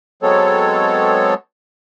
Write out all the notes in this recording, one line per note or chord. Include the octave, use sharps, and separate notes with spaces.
F#3 G#3 B3 C4 A4 C#5